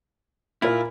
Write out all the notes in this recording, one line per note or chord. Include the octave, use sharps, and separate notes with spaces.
A#2 E4 F4 A#4